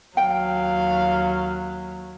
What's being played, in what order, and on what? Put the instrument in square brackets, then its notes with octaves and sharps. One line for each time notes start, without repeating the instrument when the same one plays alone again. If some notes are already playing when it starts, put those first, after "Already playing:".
[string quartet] D#2 F#3 [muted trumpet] F5 [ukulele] G5